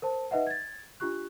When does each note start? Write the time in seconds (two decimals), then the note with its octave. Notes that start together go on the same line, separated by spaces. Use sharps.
0.02 A#4 C5 A5
0.31 D#4 B4 D#5 E5 F#5
0.47 G#6 A6
1.00 D4 F4 G4 C#6 F#6